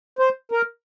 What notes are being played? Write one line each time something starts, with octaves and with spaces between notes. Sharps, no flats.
C5
A#4